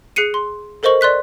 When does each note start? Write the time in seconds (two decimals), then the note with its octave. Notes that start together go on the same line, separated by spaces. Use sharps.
0.16 G#4 F#6 C7 C#7 D#7
0.34 C6
0.83 A4 A#4 C5 D#5 C#6 F#7
1.01 D5 C6 F#6 B6